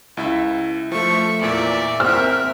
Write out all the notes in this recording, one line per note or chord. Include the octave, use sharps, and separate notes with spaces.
C#2 E4 E5
F3 A3 E5 C#6
E2 A#2 D5 E5
C4 A#4 C5 E5 F6